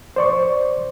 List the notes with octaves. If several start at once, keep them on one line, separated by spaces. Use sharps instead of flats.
C5 D5 C#6